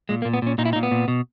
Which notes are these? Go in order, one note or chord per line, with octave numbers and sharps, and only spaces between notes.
A#2 G#3
A#3
A#2
B3
A#2 C#4
A#2 D#4
E4
D#4
A#2
B3
A#2
B2